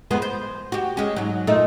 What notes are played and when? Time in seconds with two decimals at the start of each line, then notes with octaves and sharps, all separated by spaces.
0.11 F2 G#3 B3
0.22 C5
0.72 F#4 G4
0.97 G#3 C#4
1.16 G#2 F#3
1.47 A#2 A3 D#4